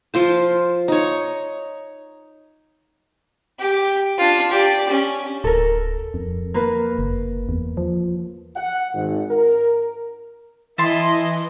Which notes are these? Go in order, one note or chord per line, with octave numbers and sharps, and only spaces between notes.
F3 F4 C5
D#4 C#5
G4
D4 F4
G4 D5
C#4
D1 A4 A#4
F2
A#3 A#4 B4
F#1
E2
F3
F#5
G#1
A#4
E3 E4 D#5 E5 A5 C6